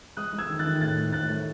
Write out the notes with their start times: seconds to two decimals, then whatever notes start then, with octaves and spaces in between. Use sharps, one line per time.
0.17 G#3 D#6 F#6
0.33 G#3
0.38 E6 G#6
0.49 D#3
0.59 F#6 A6
0.65 D#3
0.81 A2 F#6 A6
0.96 A2
1.13 A2 F#6 A6
1.29 A3